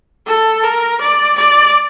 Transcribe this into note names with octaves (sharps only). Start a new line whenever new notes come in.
A4
A#4
D5
D5